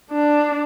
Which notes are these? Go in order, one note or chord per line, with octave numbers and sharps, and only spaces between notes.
D4